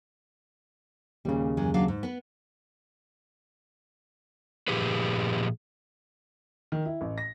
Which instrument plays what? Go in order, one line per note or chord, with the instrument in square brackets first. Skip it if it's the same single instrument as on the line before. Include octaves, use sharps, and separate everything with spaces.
[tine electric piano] D#2 C#3 [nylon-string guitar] A#2 G3
[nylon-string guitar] F#2 E3 G#3
F#3 D4 F5
G#2
B3 B4
[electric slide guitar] A#2 F3 G4 G#4 B4
[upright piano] D#3
E4
A1
A#6